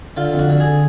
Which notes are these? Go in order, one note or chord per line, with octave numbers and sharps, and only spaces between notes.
D3 F4
F2
F#4
D3
G#4